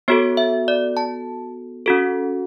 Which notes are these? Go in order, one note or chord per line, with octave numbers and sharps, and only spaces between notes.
B3 F#4 A4 C#5
E5
D5
A5
C#4 F#4 A4